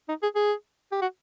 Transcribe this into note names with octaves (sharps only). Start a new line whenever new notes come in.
D#4
G#4
G#4
G4
F#4